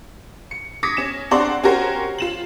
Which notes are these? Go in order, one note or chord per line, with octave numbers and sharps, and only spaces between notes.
C#7
D6 D#6 G#6 A#6 B6 C#7
C#4 E7
C4 D4 D5 F#5 A#5 C6
C#4 F#4 G4 A#4 C5
F4 E7 F#7